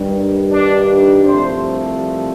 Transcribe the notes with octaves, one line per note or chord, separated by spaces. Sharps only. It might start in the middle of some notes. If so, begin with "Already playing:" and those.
Already playing: G2 D#3 G3
D4
C2 C3 F3 A3 C5